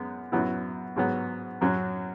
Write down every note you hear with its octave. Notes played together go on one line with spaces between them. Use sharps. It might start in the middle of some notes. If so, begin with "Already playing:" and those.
Already playing: F#2 G#3 B3
F#2 F#3 B3 E4
G#2 F#3 B3
F#2 F#3 C#4